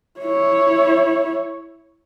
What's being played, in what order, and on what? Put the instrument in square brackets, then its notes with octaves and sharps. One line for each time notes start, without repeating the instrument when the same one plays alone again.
[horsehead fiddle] E4 C#5